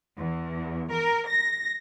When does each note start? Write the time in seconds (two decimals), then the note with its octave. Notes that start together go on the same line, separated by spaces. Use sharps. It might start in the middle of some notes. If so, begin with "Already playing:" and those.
0.18 E2
0.91 A#4
1.27 A#6